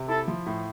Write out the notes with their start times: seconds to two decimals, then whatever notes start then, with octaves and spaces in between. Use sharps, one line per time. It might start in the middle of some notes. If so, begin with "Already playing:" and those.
Already playing: C3
0.09 E4 A4
0.28 F3
0.46 A2